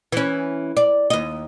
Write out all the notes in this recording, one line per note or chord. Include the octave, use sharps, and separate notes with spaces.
E3 C#4
D5
D#2 D#5